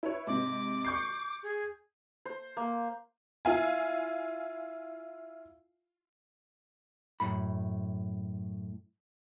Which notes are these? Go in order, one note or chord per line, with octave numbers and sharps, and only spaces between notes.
E4 B4 C#5
G#2 C3 D6
C#6 G6 C7
G#4
C5
A#3
E4 F4 F5 G#5
F#2 A2 B5